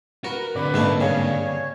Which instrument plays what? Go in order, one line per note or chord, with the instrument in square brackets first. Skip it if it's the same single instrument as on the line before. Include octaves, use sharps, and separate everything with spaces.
[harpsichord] F#4 [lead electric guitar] A#4 [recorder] B4
[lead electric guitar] D3 C4 [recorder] B4 [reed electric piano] D5
[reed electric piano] G#2 A#3 [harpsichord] B2 A3 E4
[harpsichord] G2 C#3 [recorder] C#5